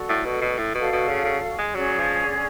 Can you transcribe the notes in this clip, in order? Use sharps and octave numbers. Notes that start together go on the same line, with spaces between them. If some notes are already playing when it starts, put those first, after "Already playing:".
Already playing: F#4 A4 D5
A2
B2
B2
A2
B2 F#4 A4 D5 F5
B2
C#3
C#3
G#3
F#3 C#4 G#4 D5
F3
D3